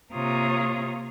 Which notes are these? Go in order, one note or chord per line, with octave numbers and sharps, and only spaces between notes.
C3 A#3 F4 C#5 A#5 D#6